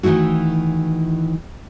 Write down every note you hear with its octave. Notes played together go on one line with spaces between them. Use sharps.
D#3 E3 A3 E4 F#4